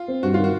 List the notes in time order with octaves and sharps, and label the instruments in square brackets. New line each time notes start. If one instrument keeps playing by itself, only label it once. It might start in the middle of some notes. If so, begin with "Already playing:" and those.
Already playing: [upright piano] F4
[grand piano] C4
[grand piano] G2 [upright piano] F#4
[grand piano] D#3 [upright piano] F4
[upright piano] F#4